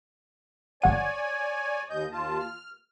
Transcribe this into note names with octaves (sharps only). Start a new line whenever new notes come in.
G1 C#5 D5 F#5 G#5 D#7
D#2 D#5 G6
D#2 F4 A5
F6